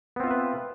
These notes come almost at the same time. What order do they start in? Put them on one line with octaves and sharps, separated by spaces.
B3 C4 F4 E5 B4